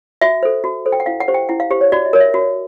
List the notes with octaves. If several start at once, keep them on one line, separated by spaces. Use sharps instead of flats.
F#4 E5
A4 C5
F#4
A4 C5
G5
F#5
E4 F5
F#5
G4 C5
G5
E4 F#5
F5
G4 C5
C#5
F#4 D5
D#5
A#4 C#5
E5
F#4